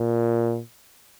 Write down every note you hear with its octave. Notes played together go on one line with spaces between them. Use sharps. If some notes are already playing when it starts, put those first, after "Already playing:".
Already playing: A#2